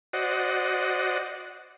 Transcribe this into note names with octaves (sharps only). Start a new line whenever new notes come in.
F#4 C5 D5 D#5 F#5